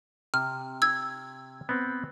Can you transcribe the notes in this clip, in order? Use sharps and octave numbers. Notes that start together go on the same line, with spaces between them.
C3 F6
E6 G#6
B3 C4